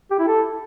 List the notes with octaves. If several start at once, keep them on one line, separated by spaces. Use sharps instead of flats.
G4
E4
A4